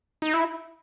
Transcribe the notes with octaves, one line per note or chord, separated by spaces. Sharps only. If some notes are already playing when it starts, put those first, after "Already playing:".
D#4
E4